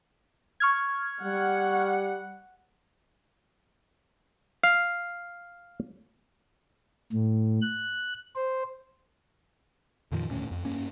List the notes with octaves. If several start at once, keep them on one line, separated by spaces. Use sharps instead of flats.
C#6 F6 G#6
G3 F#5
F5
A2
F#6
C5
F2 A#2 D#3 F3
D#1 D2 A2 C#4
F2
G2 A#3 C#4